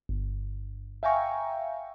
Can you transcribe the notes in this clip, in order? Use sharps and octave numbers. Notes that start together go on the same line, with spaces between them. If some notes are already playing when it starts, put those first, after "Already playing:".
G1
E5 F5 G5 G#5 A#5 C#6